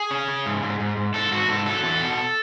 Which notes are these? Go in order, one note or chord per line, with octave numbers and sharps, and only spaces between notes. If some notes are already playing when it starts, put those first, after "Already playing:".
Already playing: G#4
C#4
C#3
G#2
G#2
G#2
G#2
G#2 A4
G#2 F#4
G#2 A4
F#3 A4
E2 A4
B2